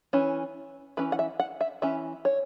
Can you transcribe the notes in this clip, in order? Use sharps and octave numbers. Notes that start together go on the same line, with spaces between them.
E3 C#4
E3 C#4 B4
F#5
E5
F#5
E5
E3 C#4 E5
C#5